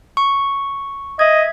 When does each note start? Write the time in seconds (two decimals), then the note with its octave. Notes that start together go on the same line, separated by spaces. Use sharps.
0.17 C#6
1.19 D#5 E5 G#6